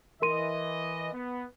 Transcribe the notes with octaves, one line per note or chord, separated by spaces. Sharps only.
E3 A#4 D#5 C6 D#7
B3